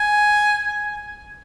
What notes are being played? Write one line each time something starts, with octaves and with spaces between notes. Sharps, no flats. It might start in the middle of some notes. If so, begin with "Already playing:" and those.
Already playing: G#5